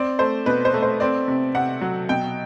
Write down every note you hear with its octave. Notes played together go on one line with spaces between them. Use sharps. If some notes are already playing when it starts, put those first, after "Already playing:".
Already playing: C4 D5
A3 C5
B2 B4
C5
A3
C5
C4 D5
C3
C3 F#5
F#3
B2 G5